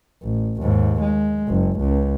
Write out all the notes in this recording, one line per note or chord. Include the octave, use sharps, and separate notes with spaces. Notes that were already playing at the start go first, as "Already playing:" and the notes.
A1
D#2 G#2
G#3
F#1
C#2